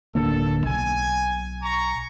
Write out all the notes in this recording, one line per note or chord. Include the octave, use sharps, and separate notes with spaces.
D1 D3 A#3 A4
B1 G#5
A#5 C#6